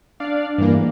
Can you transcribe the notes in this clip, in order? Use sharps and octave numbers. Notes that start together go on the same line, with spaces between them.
D4 D5 F5
G2 E3 A#3
G#2